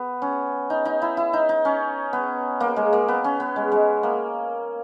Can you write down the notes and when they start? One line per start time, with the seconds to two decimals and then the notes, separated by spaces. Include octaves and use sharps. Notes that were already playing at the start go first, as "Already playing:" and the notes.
Already playing: B3
0.22 C#4
0.70 D#4
0.85 D#4
1.02 E4
1.17 E4
1.33 D#4
1.49 D#4
1.65 C#4
2.13 B3
2.60 A#3
2.76 G#3
2.93 A#3
3.08 B3
3.24 C#4
3.40 B3
3.56 G#3
3.72 G#3
4.03 A#3